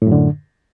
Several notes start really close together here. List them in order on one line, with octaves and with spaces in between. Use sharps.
A2 F#2 D3